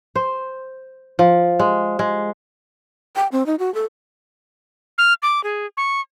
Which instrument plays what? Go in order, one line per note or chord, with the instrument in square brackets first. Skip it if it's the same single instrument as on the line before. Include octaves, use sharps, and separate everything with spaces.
[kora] C5
F3
G#3
G#3
[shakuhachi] G5
C4
D#4
F#4
A4
[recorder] F6
D6
G#4
C#6